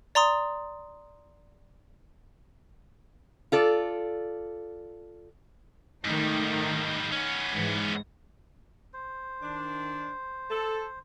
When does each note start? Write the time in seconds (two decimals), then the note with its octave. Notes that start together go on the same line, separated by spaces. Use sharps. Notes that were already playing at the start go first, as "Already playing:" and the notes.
0.15 D5 A#5 C6 D#6
3.52 F4 A4 D5
6.05 G#2 D#3 G3 A3 D#4
7.12 B3 C#4
7.53 G#2 E3
8.94 C5
9.41 D#3 D4
10.50 A4